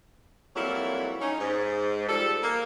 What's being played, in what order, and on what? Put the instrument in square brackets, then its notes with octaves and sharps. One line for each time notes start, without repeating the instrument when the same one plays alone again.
[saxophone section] F2 F#3 G3 A#3 E4
C#4 D#4
G#2
F3 G3 A4
A#3